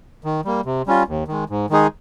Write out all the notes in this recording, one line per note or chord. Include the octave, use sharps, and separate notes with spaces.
D#3
G3 A#3
C3
G3 C#4 F4
D#2
D#3 G#3
G#2
D#3 G#3 D#4 G#4